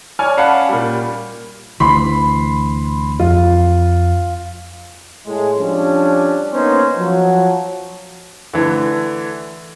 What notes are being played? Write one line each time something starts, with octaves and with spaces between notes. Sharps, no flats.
C#5 D5 G#5 F6
C#4 D5 F5 F#5 A5 B5
A#2 G3
D2 E3 B5 C6
F2 F4
A2 G#3
F3 G3 C#4 D4
A#3 B3 C#4 D#4 C5
F3 F#3
D3 E3 A3